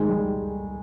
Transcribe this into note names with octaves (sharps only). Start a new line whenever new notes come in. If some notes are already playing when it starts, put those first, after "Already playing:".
Already playing: D#3 G#3
G3